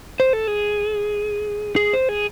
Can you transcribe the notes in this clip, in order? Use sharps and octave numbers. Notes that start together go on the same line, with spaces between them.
C5
A4
G#4
G#4
C5
G#4